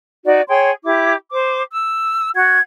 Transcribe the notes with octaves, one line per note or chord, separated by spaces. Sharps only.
D#4 F#4 D5
G#4 C#5 G5 C6
E4 G4 D6
C5 D6
E6
F#4 F#5 G#6